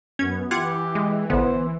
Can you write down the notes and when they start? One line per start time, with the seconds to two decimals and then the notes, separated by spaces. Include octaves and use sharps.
0.19 F#2 B3 C#4 G#6
0.51 E3 F4 G4 F#5 G#6
0.95 G#3
1.30 A1 D3 B3 C5